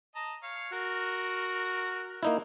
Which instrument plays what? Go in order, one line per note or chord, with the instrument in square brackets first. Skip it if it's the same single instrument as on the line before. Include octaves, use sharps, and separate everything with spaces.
[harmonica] D#5 A5 A#5
C#5 F5
[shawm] F#4 [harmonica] A#4
[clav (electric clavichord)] A#3 D#4 E4